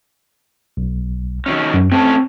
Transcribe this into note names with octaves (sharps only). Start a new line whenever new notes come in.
B1
D#3 F#3 C#4
F#2
A3 C4 C#4 A5